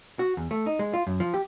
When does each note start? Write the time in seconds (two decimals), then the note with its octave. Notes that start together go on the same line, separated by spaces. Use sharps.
0.19 F#4
0.37 E2
0.51 A3
0.66 D#4
0.79 G#3
0.93 F4
1.07 F#2
1.20 F3
1.34 G4